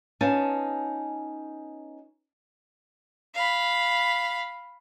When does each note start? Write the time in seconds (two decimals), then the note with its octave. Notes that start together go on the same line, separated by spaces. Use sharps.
0.21 B3 C#4 D#4 F4 G#5 A5
3.35 F5 B5